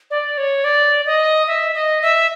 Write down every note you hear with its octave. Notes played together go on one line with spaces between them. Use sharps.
D5
C#5
D5
D#5
E5
D#5
E5